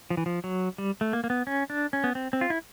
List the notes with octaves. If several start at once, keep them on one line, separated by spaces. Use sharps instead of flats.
F3
E3
F3
F#3
G3
A3
A#3
A#3
B3
C#4
D4
C#4
B3
C4
C4
F4
E4